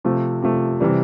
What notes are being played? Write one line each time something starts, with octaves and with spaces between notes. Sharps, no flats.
C3 F3 A3
C3 F3 A3
C3 E3 G3